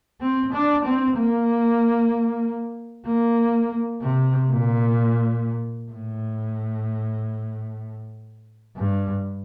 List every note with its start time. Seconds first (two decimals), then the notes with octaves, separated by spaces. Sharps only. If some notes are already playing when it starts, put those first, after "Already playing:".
0.21 C4
0.53 D4
0.85 C4
1.16 A#3
3.06 A#3
4.01 C3
4.49 A#2
5.92 A2
8.77 G2